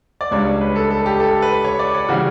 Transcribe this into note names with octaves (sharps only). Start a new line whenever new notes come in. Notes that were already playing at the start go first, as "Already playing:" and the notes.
D5
C#2 C#3 G3 D4 C#5
C#5
B4
A4
A4
G4
A4
B4
C#5
D5
C#5
C#3 E3 G3 F#4